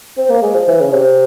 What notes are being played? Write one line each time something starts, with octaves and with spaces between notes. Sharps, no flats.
C4
A#3
G#3
F3
E3
C#3
C3